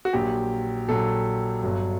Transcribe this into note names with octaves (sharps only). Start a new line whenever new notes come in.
F#4
A#1 A#2 F#3 G4
A#1 A#2 F#3 A4
G1 G2 F#3